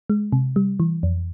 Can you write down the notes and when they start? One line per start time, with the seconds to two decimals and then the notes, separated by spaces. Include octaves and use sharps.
0.10 G#3
0.32 C3
0.56 G3
0.80 E3
1.03 F2